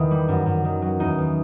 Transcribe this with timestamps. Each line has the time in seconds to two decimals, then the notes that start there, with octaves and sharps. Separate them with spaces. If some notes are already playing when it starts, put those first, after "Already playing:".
Already playing: E2 D#3 E4
0.11 G3
0.28 F#2
0.46 F#2
0.65 D#3
0.82 F#3
1.00 E2 D#4
1.18 E2